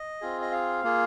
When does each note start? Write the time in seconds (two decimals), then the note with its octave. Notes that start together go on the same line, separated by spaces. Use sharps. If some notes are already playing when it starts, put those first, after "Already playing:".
Already playing: D#5
0.21 C4 F4 G#4
0.41 D#5
0.52 F5
0.84 A#3 F4 G#4